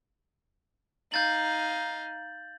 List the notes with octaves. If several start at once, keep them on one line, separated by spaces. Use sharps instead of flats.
D#4 F5 G6 A6 F#7